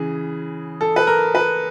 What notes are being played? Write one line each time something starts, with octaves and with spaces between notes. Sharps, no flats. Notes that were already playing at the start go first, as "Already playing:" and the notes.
Already playing: C#3 E3 G#4
A4
B4
A#4
B4